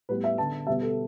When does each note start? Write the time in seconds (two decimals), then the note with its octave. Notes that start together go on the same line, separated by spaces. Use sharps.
0.09 A2 G3 B3 B4
0.24 E5
0.38 D3 B3 A5
0.67 B2 G3 B3 E5
0.82 A4